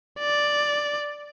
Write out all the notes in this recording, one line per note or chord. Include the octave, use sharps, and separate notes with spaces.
D5